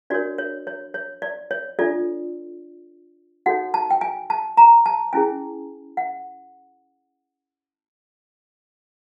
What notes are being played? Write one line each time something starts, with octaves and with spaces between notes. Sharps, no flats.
D4 F#4 A#4 C#5 D5
C#5
C#5
C#5
D5
C#5
D4 F4 A4 D5
D#4 F#4 A4 C#5 F#5
A5
G5
G#5
A5
A#5
A5
C#4 E4 G#4 G#5
F#5